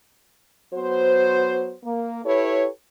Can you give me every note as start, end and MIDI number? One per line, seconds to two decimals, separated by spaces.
0.73 1.74 54
0.73 1.74 59
0.73 1.74 66
0.73 1.74 72
1.84 2.20 58
2.24 2.67 64
2.24 2.67 67
2.24 2.67 69
2.24 2.67 71
2.24 2.67 73